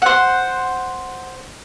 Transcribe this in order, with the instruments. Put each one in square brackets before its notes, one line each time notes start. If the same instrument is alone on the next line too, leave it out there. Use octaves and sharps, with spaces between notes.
[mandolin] C5 F#5